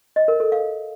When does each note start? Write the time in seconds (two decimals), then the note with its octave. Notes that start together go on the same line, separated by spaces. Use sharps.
0.16 D#5
0.28 A#4
0.40 A4
0.52 F5